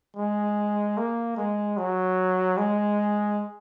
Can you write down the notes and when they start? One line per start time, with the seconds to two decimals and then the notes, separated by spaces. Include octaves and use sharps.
0.17 G#3
0.97 A#3
1.37 G#3
1.77 F#3
2.57 G#3